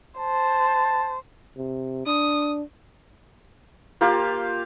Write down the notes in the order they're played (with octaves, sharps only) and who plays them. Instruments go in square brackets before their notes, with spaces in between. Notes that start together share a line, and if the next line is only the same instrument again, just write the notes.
[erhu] C5 [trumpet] A5
[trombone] C3
[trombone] D4 [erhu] D#6
[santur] A#3 F4 G4 F5